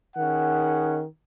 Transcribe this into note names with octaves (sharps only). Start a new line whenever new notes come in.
D#3 C#4 G#4 F#5